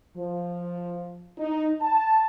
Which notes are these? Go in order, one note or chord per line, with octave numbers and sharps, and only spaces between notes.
F3
D#4
A5